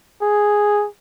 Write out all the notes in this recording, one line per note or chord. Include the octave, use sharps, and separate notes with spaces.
G#4